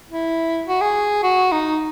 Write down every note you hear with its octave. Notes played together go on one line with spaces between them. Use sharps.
E4
F#4
G#4
F#4
D#4